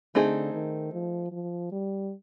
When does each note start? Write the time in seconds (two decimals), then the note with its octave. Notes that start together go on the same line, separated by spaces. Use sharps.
0.15 D3 A3 C4 D#4 G#4
0.54 D#3
0.93 F3
1.32 F3
1.72 G3